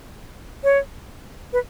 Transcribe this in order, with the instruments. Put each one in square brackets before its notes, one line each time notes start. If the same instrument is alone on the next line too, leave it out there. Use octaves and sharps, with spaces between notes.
[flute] C#5
B4